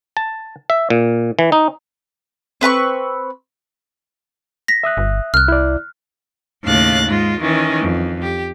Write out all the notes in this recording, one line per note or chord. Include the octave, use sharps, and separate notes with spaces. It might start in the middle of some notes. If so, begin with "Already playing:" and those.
A5
E5
A#2
E3
D#4
C4 B4 A#5 C#6
A#6 B6
E5 D#6 F#6
G1
C2 F6 F#6
E4 D5
D#2 A2 C#3 F5 F#6 A6
G#2 G#3 F4
D#3 E3 C#4
F2
G4